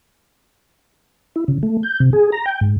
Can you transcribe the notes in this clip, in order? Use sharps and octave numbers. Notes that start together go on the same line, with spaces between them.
E4
C#3
A3
G6
C3
G#4
A#5
G5
G#2